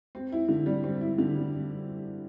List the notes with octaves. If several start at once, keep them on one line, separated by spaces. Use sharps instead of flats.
C4
E4
D3
G3
C4
E4
D3
G3